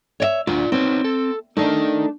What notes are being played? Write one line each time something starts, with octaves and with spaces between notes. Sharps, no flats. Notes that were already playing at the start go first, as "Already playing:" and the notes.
C#5 D5 E5
D2 F4 D5
C4 D#4 B4 C#5
A4
A3 D4 D#4 A#4 D#5